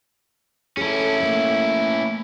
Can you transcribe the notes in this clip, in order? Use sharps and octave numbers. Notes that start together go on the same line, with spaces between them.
C#4 E4 G#4 A4
A3 A#3